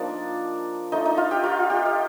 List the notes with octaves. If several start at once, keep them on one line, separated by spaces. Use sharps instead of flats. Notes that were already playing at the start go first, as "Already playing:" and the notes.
Already playing: F3 A#3 D4 D#4 D5
A3 D4 D#4 F4 D#5
D#4 D#5
F4 F5
G4 G5
F4 F5
G4 G5
D#5